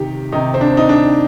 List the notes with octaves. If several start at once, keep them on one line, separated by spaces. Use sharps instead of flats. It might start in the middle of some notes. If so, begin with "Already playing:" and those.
Already playing: C3 D#3 G4
C3 D#3 D#4
C4
D4
D#4
D4